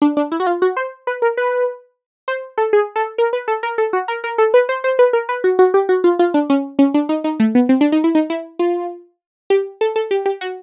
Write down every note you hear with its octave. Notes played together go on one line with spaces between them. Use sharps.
D4
D4
E4
F#4
F4
F#4
C5
B4
A#4
B4
C5
A4
G#4
A4
A#4
B4
A4
A#4
A4
F#4
A#4
A#4
A4
B4
C5
C5
B4
A#4
B4
F#4
F#4
G4
F#4
F4
F4
D4
C#4
C#4
D4
D#4
D#4
A3
B3
C4
D4
D#4
E4
D#4
E4
F4
G4
A4
A4
G4
G4
F#4